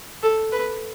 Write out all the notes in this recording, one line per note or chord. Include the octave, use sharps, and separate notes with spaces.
A4
B4